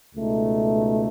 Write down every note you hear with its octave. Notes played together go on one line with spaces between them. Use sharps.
C#2 B2 A3 D#4